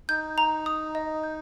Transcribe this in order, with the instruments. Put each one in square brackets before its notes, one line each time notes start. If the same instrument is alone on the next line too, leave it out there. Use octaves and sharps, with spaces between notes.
[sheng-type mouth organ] D#4 [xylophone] G6
[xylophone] A#5
D#6
D#5
G6